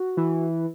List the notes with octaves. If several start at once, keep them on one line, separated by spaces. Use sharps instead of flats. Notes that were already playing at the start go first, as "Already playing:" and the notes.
Already playing: F#4
E3